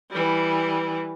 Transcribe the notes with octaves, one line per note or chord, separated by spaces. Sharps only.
E3 G3